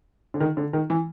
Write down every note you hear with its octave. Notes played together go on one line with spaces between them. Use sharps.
D3
D#3
D3
D#3
E3